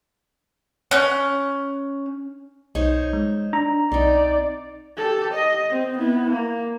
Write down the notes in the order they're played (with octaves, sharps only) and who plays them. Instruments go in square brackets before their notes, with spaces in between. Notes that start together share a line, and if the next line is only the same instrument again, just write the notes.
[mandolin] C#4 F#6
[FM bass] B1 [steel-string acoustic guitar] D#4 C5 C#5
[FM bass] G#3
[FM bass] D4 [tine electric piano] A#5
[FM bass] B1 [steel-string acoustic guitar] C4 D#4 [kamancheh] D5
[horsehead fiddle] G4 A4
D#5
C4
B3 E4
A#3